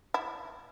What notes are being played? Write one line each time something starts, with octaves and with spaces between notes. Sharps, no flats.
E4